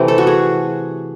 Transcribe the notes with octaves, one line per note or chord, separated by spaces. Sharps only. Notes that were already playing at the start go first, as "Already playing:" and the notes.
Already playing: C3 E3 A3 C4
A4
F#4
G#4